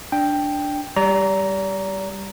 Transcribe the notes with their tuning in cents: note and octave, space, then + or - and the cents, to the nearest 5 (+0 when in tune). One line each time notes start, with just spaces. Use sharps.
D4 +0 G5 +5
G3 +0 D5 -40 A#5 +0